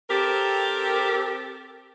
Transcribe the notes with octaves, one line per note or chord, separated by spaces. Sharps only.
C4 G4 A4 A#4